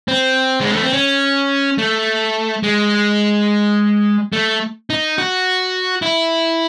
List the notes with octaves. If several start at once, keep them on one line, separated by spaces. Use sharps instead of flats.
C4
G#3
A3
C4
C#4
A3
G#3
A3
D#4
F#4
E4